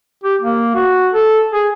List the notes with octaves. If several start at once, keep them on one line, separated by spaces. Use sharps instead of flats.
G4
A#3
F#4
A4
G#4